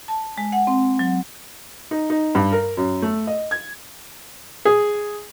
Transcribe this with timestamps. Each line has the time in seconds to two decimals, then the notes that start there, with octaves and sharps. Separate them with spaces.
0.08 A5
0.38 G#3
0.52 F#5
0.67 C4
0.99 F#3
1.91 D#4
2.10 D#4
2.35 G2
2.52 A#4
2.77 F#2
3.02 A3
3.27 D#5
3.51 G#6
4.65 G#4